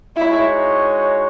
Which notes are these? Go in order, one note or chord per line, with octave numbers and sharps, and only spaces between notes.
G#3 D#4 E4 F#4 C#5